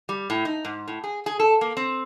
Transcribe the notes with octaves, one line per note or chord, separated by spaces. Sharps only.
G3
A2
D#4
G#2
A2
G#4
G#4
A4
A#3
C4